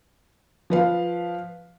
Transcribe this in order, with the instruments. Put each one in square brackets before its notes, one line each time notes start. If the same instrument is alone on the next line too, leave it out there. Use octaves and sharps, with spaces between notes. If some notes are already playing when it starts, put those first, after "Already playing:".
[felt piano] F3 B4 F5